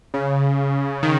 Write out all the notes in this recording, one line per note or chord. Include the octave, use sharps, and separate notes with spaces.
C#3
D#3